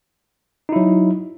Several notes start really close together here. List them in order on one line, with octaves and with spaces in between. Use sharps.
D#4 E4 F#3